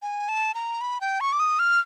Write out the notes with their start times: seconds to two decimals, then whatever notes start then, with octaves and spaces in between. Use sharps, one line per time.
0.02 G#5
0.29 A5
0.55 A#5
0.81 B5
1.01 G5
1.21 C#6
1.33 D6
1.40 D#6
1.59 F6